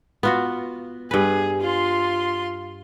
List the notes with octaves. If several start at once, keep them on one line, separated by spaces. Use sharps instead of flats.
B3 F4 F#4
G2 G#4 B4
F4 C6